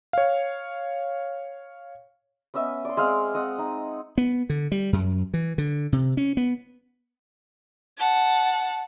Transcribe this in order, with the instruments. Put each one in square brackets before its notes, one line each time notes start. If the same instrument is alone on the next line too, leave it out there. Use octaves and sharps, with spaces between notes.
[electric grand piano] C#5 F5
[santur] B3 C#4 D#5 E5
D5 C6
G#3 C4 F5
C4 D#5 F#5
D#4
[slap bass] B3
D3
G3
F#2
E3
D3
C3
C#4
B3
[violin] F#5 A5